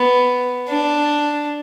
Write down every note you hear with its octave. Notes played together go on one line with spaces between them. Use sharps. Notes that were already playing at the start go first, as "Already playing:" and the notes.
Already playing: B3
D4